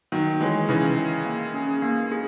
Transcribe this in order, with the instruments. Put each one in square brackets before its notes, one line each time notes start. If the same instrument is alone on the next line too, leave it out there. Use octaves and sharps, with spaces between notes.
[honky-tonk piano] D#3 F#3 [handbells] D#4
[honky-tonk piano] E3 G#3 [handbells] G#4 C#5 E5 G#5
[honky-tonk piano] C#3 E3 [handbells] D#4
[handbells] G#4 C#5 E5 G#5
A#3
C#4 G#4
A#3
C#4 G#4